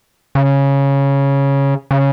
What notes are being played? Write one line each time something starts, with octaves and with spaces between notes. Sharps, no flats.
C#3
C#3